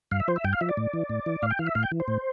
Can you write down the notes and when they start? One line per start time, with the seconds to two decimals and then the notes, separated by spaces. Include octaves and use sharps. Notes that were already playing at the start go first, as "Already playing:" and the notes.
0.11 G2 F5
0.20 E5
0.28 F3 C5
0.36 E5
0.44 G2 G5
0.53 F5
0.61 F3 E5
0.69 D5
0.77 A2
0.93 E3
1.10 A2
1.26 E3
1.42 A2 F5
1.51 G5
1.59 E3 F5
1.67 E5
1.75 A2 F5
1.83 G5
1.91 E3
2.00 C5
2.08 A2